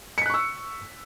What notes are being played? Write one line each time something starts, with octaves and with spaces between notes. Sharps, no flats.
C#6 E6 F#6 B6 C#7